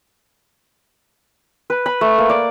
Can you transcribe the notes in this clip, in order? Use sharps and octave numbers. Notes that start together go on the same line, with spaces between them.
B4
B5
A3
A#3
D5